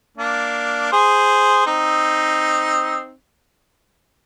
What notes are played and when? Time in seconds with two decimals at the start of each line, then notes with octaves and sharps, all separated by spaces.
0.17 A#3 D4
0.92 G#4 C5
1.66 C4 D#4